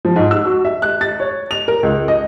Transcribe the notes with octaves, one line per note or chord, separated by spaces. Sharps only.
F3
G#2
E6
F#4
E5
F#6
A6
C#5
F7
A#4
C#2
D#5